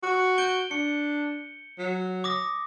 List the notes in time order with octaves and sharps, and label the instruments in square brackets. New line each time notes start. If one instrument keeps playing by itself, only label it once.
[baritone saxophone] F#4
[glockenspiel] G6 D7 G7
[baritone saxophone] D4 [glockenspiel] C#7
[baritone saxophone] F#3
[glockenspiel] D6 D#6 A#6